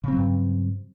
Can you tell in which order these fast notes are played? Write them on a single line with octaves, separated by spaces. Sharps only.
C#3 C4 F#3 G2